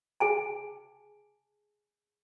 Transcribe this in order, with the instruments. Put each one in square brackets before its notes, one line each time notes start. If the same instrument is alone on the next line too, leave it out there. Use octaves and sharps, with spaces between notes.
[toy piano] G#4 G#5 A5